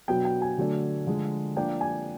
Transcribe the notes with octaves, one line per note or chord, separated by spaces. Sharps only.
B2 F#3 B3 D4 G5
G5
G#5
D3 F#3 A3 D4
D3 F3 G#3
F3 A#3 D4 G5
G#5